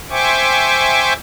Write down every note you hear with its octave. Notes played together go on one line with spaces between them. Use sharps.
C5 E5 G5 G#5 C#6 D6